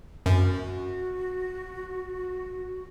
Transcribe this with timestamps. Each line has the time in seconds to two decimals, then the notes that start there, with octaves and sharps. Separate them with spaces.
0.26 F#2 F#4